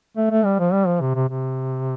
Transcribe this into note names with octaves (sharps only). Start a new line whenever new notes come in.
A3
A3
G3
F3
G3
F3
C3
C3
C3